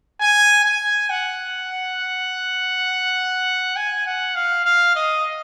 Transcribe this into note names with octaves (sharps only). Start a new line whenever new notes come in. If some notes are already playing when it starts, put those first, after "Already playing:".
G#5
G#5
F#5
G#5
F#5
F5
F5
D#5